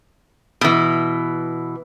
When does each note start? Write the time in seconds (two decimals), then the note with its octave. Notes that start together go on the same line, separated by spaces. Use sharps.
0.61 B2 E3